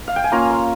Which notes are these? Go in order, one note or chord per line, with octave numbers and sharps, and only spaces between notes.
F5
G5
G#5
A#3 C#4 F4 A#5
C6